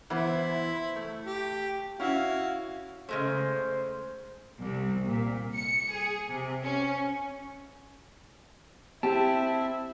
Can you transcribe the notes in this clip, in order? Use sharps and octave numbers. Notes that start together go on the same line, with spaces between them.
E3 B3 E4 C5
A3
G4
C#4 E4 F#4 F5
C#3 G#3 A3 C5
C2
A#2
C#7
G#4
C3
C#4
C4 E4 G4 A5